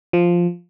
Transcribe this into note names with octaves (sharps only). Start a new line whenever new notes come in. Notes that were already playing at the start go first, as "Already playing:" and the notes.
F3